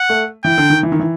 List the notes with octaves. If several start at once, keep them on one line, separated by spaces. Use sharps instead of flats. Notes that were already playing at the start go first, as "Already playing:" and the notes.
Already playing: F#5
A3
E3 G5
D3
D#3
E3
D#3
E3